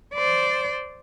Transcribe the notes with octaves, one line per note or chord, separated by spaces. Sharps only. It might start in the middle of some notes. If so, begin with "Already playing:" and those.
C5 D5